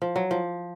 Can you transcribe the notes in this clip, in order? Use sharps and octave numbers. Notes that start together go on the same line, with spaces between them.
F3
F#3
F3